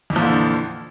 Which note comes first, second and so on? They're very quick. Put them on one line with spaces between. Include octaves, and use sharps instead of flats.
F2 E3 F3 A#2 D3